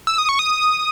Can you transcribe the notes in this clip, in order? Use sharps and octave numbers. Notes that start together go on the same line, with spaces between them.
E6
D#6
C#6
D#6